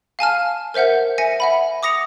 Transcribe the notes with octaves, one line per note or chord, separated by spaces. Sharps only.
F5 G#5 A5 F6
A#4 C5 E5 F#5 G6
E5 G#5 A#6 C#7
E5 F#5 B5
D6 D#6 A#6 C#7 F7